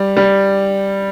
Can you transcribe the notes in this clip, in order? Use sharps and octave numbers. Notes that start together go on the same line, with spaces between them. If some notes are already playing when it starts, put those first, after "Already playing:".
Already playing: G3
G3